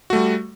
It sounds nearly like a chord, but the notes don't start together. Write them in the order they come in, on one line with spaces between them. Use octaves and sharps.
F#4 A3 G3